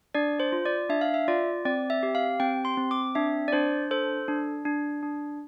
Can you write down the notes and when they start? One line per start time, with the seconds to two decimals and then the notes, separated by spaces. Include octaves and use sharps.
0.15 D4 D5
0.40 C5
0.52 F4
0.65 D5
0.89 D4 E5
1.01 F5
1.14 E5
1.28 F4 D5
1.65 C4 D5
1.90 E5
2.03 G4
2.15 F5
2.40 C4 G5
2.65 C6
2.77 C4
2.91 D6
3.15 D4 E5
3.48 D5
3.52 D4 C5
3.91 A4 C5
4.28 D4
4.65 D4
5.03 D4